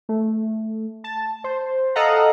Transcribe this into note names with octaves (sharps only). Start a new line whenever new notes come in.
A3
A5
C5
A4 D#5 F5 F#5 A#5